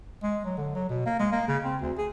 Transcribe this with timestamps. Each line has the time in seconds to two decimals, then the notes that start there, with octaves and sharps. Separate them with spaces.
0.23 G#3
0.45 F#3
0.58 D3
0.75 F#3
0.89 B2
1.06 A#3
1.20 G#3
1.32 A#3
1.48 C#3
1.64 C4
1.82 D2
1.98 G#4